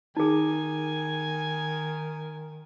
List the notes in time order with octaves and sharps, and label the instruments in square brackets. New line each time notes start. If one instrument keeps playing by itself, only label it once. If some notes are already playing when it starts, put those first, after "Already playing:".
[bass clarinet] D#3 [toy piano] D#4 G#4 [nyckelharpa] G#5